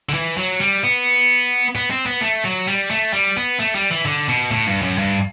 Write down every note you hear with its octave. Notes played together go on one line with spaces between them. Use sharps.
D3
E3
F#3
G3
B3
B3
C4
B3
A3
F#3
G3
A3
G3
B3
A3
G3
E3
D3
B2
A2
G2
F#2
G2